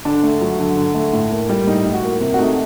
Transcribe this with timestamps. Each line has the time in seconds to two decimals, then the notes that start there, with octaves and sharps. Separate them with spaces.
0.05 D3 D4
0.23 A3
0.41 F#3
0.59 D3
0.77 D3
0.94 A3
1.13 A2
1.31 A#3
1.49 G3
1.67 A2 D#4
1.85 A2
1.94 F#4
2.03 A#3
2.21 C3
2.34 F#4
2.39 A3 D#4